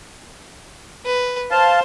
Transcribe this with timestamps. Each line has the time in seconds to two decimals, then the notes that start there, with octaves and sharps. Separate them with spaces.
1.05 B4
1.51 C5 F5 A5